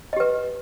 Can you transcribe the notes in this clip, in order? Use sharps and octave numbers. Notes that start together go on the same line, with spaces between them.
G4 B4 D#5